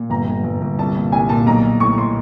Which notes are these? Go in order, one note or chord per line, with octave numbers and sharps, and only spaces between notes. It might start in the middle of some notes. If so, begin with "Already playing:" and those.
Already playing: A#2
G1 A#5
G1
G1
G1
C2 A5
A#2
C2 G#5
A#2 A5
B1 A#5
B1
A2 C#6
C6